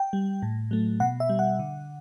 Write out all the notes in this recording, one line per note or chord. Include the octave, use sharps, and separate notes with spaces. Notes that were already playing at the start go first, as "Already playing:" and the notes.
Already playing: G5
G3
A2
F#3 A3
B2 F#5
E5
G3
F#5
D3